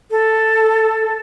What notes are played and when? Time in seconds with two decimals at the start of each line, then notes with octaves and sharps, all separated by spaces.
0.11 A4